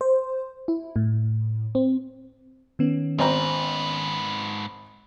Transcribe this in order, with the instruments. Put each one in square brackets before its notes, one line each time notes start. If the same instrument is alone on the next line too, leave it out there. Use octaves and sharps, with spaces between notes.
[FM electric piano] C5
E4
A2
C4
D#3 B3 C#4
[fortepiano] G#1 C4 A#5 [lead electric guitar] G#2 B4